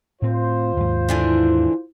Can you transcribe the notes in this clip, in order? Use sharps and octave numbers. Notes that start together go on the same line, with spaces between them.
A2 C4 F4 C5
D#2 G#2
D3 E3 D4